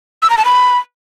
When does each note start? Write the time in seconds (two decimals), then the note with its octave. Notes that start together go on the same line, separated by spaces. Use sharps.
0.22 E6
0.30 A#5
0.38 A5
0.45 B5